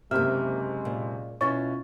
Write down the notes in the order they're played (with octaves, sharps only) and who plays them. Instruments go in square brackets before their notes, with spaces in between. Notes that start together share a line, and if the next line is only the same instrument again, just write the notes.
[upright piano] F#1 C3 [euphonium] G#3 [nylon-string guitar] A#3 E5 [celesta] F6
[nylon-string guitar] A#2
[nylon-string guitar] B2 E4 F4 [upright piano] C#4 [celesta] C#6 A6